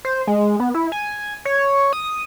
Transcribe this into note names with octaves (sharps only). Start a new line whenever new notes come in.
C5
G#3
B3
E4
G#5
C#5
D#6